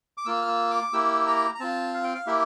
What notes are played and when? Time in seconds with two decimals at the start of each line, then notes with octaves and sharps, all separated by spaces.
0.18 D6
0.26 A#3 F4 E6
0.42 F6
0.48 E6
0.71 D6
0.93 A#3 E4 G4 E6
1.27 A#5
1.55 A#5
1.60 C4 F4 A5
1.94 F5
2.04 G5
2.15 F5
2.27 A#3 E4 G4 E5